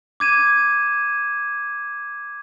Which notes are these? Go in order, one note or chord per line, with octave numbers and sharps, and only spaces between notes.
D6 G#6 D#7 E7